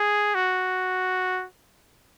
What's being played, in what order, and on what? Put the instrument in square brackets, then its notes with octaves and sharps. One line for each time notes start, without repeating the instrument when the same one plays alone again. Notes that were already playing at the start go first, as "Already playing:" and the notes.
Already playing: [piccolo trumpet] G#4
F#4